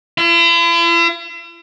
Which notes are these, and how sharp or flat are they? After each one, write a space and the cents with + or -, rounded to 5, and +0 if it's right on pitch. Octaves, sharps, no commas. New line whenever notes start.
E4 +45